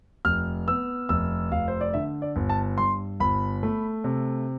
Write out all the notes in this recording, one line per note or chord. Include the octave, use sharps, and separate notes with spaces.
F1 F6
B3 E6
F1 E6
F1 F5
C5
D5
D3 E5
D5
G1
A5
G2 C6
G1 B5
A3
C3